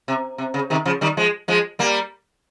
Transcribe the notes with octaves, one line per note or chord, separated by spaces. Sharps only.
C3
C3
C#3
C3 D#3
C#3 F3
D#3 G3
F3 G#3
F3 G#3
G3 A#3